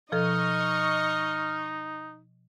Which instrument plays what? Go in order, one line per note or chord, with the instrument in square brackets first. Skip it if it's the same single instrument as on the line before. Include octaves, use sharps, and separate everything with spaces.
[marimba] B2 F3 A4 [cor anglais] D#4 [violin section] D#5 C#6 [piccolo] F6